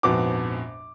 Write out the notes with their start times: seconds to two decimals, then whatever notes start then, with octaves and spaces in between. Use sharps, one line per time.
0.03 A#1 F2 G#2 B3 F#4 D6